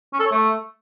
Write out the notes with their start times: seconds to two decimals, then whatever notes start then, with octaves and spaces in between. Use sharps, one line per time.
0.13 C#4
0.19 A4
0.26 C#5
0.32 A3